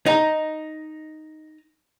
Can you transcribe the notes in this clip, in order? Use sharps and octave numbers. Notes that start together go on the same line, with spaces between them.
D#4 D#5 A#5